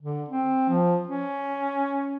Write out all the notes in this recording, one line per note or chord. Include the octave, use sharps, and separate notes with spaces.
D3
C4
F3
C#4